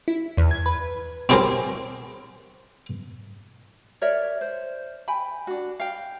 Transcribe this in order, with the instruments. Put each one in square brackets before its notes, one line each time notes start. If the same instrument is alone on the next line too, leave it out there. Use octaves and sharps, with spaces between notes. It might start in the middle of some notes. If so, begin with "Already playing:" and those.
[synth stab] E4
E2
G#6
B4
[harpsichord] C4 E4 G4 G#4 A#4 C5
[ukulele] A#4 C#5 D5 E5
C5
G5 G#5 B5
D4 F#4
F5 G5